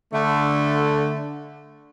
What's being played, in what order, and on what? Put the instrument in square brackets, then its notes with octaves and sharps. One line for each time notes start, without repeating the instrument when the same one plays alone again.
[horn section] D3 A3